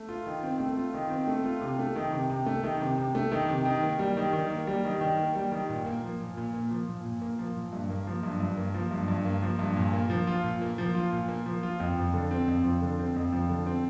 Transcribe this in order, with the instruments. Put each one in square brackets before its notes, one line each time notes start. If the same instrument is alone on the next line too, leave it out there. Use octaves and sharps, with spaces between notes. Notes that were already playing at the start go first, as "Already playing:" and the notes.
Already playing: [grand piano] A3
F4
D#3
C4
A3
F4
D#3
C4
A3
F4
C3
A3
D#3
C3
C3
A3
D#3
C3
C3
A3
D#3
C3
D#3
A#3
G3
D#3
D#3
A#3
G3
D#3
D#3
A#3
G3
D#3
A#2
A#3
F3
A#2
A#2
A#3
F3
A#2
A#2
A#3
F3
A#2
G2
A#3
F3
G2
G2
A#3
F3
G2
G2
A#3
F3
G2
A#2
A#3
F3
F4
A#2
A#3
F3
F4
A#2
A#3
F3
F4
F2
F3
D3
C4
F2
F3
D3
C4
F2
F3
D3
C4